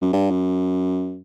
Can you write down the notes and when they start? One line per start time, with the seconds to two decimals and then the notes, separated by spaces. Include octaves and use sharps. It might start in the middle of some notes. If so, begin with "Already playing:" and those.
0.02 F#2
0.13 G2
0.31 F#2